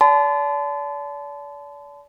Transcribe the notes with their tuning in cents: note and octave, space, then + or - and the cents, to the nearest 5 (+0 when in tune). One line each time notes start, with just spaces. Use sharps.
D5 -40 A5 -25 C6 -45